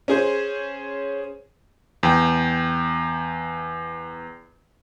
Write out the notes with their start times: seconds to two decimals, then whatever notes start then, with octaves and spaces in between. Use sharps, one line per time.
0.08 C#4 G#4 C5
2.03 E2 G5